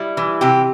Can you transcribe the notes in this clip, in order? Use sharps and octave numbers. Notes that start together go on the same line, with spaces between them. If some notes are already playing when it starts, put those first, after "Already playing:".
Already playing: G3 E4
E3
C3 G4